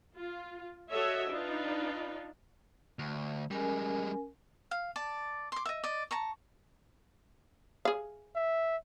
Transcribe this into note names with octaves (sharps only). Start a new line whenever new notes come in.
F4
F#4 A4 C#5 D#5 E5
D4 D#4 F4 B4
D2
G3 G#3 C#4 A#4 G#5
F5
D5 A5
C6 D6
D#5 E5
D5 D#5
A5 A#5 C#6
G#4 F5
E5